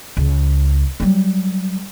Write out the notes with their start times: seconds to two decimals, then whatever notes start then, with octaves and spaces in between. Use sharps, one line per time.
0.17 C#2
1.00 F#3 G3